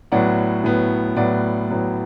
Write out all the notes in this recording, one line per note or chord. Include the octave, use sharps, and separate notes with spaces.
A2 F#3 B3 D5 F#5
A2 F#3 B3
A2 F#3 B3 D5 F#5
A2 F#3 B3